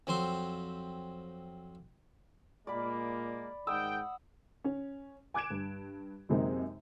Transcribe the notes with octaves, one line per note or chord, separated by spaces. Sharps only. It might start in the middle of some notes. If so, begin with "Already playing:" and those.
F2 F#3 C4 C5 C6
A#2 G#3 A#3 D5 B5
G#2 D#3 F#5 G5 D#6 E6
C#4
G#5 D6 F#6 G#6 D7 E7
G2
F#2 C3 G#3 A#3 C4 D#4